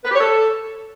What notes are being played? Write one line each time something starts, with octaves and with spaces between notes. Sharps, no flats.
B4
G4
C#5
A4